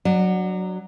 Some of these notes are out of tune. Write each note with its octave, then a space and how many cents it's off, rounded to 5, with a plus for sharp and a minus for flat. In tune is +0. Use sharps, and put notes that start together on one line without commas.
F#3 +0 D4 +0 D5 +35